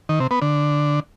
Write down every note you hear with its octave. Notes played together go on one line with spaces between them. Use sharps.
D#3
C3
B3
D3